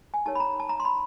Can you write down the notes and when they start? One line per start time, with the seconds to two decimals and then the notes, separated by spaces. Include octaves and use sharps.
0.14 G#5
0.26 D#4 G4 A#4 C#5 A5
0.35 B5
0.40 A#5
0.60 A5
0.69 A#5
0.80 C6
0.85 B5